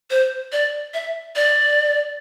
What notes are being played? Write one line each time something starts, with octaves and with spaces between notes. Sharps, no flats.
C5
D5
E5
D5